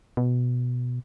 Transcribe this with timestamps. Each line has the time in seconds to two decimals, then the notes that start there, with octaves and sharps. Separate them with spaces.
0.17 B2